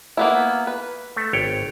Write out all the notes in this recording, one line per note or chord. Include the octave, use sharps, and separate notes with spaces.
A#3 B3 E4
B4
A3
G#1 C#5 G5